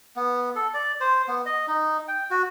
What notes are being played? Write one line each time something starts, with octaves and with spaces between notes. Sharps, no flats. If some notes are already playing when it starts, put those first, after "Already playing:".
B3
A4
D5
C5
B3
D#5
D#4
G5
F#4